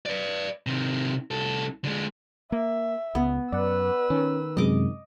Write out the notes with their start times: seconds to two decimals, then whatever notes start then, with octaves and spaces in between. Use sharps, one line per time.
0.06 B4 D5
0.67 C3 D#3
1.31 C2 A4
1.84 D3 G#3
2.52 A#3 E5
3.15 C#2 B3
3.52 F#2 B4 D5 F#5 E6
4.10 D#3 C#4
4.57 F#2 C3 G#3 D#5 D6